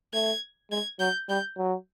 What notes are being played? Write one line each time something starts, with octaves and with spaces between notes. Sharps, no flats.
A3 G#6
G#3 G#6
F#3 G6
G3 G6
F#3